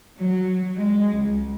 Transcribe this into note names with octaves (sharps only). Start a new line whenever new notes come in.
F#3
G#3
C#2